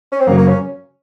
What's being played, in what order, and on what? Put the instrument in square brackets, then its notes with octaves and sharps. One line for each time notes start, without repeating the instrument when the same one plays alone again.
[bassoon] C#4
C4
[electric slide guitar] F#2 C#3 F#3 [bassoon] A#3
[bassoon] A#3
C#4